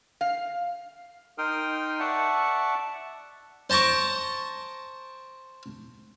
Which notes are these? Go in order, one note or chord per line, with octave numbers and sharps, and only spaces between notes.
F5
D#4 A#4 G5 C6 D#6 F6
D5 E5 F#5 A5 C#6
C5 A5 A#5 C#6 D6